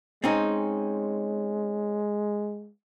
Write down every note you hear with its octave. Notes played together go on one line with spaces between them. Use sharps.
G#3 C4 C#4 D#4